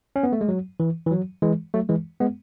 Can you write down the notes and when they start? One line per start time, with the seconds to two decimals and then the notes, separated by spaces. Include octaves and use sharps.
0.16 C#4
0.23 B3
0.33 A3
0.41 G#3
0.48 F#3
0.80 E3
1.07 E3
1.11 F#3
1.42 E3 G#3
1.74 F#3 A3
1.89 E3 G#3
2.20 G#3 B3